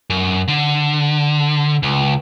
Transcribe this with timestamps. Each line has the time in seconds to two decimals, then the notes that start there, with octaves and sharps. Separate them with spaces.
0.10 F#2
0.48 D3
1.83 C#2